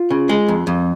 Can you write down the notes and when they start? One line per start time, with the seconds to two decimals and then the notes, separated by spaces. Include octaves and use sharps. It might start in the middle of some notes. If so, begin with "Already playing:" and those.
Already playing: F4
0.10 C#3
0.29 G#3
0.48 F2
0.67 F2